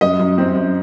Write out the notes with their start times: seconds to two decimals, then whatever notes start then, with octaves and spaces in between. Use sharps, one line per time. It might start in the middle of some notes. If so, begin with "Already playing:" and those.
0.01 F#2 D#5
0.19 F#2
0.38 C4
0.56 F#2